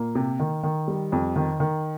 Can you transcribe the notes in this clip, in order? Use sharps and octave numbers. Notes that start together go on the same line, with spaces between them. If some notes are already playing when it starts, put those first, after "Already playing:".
Already playing: A#2 A#3
C3
D#3
D#3
G3
F2
D#3
D#3